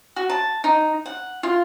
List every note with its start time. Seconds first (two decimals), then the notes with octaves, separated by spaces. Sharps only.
0.16 F#4
0.30 A5
0.64 D#4
1.06 F#5
1.43 F4